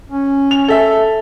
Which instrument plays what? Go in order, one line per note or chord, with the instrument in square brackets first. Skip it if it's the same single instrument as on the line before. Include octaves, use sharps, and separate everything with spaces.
[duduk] C#4
[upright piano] F7
A4 E5